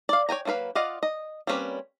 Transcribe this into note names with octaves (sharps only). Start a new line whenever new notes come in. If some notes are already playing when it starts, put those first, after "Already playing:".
D5 F5
C#5 G5 G#5 A#5
F#3 A#3 F4 B4 F5
F4 D5 D#5 F5 F#5
D#5
G3 A#3 C4 C#4 B4